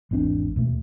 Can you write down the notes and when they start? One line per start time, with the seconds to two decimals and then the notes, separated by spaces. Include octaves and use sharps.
0.11 G#1 E2 C4 D4
0.56 D#2 B2 A3